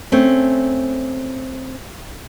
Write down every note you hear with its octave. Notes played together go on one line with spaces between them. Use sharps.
A3 C4 C#4